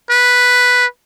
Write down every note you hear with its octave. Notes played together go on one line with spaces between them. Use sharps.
B4